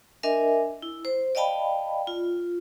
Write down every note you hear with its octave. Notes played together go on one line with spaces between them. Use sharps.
D4 A#4 D#5 E5 G#5
E4
C5
D5 D#5 F5 G5 A5 B5
F4